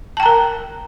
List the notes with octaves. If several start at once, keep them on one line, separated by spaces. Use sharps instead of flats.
A#4 G5 A5 A#5